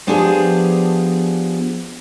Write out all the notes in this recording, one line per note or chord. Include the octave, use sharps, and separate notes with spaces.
F3 B3 D4 F4 G4 G#4